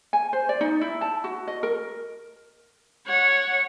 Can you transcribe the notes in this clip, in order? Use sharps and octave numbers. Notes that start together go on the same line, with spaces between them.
G#5
C5
D5
D#4
E4
A5
F#4
D#5
A#4
C#5 F#5